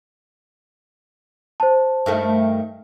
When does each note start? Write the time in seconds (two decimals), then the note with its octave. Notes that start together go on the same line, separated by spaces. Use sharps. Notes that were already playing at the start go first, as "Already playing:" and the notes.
1.60 C5 A5
2.06 G2 D#3 A3